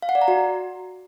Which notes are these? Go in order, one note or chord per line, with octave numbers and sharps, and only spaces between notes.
F5
F#5
D5
A#5
F#4